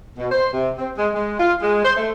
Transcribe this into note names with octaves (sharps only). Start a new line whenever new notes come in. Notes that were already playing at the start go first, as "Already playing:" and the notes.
B2
C5
C3
C4
G#3
G#3
F4
G#3
C5
A3